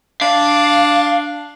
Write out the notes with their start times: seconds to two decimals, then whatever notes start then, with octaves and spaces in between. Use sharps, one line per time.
0.21 D4 F5